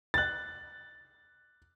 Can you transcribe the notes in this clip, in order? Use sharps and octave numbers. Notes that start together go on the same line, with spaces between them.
F#6 A6